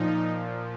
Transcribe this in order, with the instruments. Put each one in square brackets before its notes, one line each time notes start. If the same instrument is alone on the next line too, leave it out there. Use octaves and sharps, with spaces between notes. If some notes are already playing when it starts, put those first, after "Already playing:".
Already playing: [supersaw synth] A#2 F3 D#4